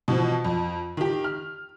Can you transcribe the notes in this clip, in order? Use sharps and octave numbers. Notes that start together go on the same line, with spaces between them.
B2 E3 F3
F2
D#3 G4
F6